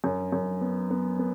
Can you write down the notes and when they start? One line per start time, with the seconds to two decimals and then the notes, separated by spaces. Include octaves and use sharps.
0.04 F#2
0.32 F#2
0.61 B3
0.90 B3
1.19 B3